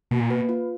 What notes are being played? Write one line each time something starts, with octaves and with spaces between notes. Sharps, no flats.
B2 A#3
A#2
B2 B4
F4